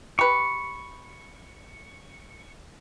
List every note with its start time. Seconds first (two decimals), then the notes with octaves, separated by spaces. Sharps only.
0.19 G4 B4 C#6